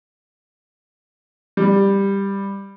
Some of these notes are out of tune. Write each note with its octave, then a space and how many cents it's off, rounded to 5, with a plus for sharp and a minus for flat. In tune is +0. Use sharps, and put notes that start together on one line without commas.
G3 +10